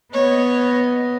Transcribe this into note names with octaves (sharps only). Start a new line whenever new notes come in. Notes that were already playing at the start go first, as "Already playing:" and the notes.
B3 C#5 D#5